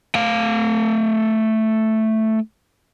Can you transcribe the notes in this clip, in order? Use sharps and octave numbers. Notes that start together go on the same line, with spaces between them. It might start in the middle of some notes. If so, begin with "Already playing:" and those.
A3 F5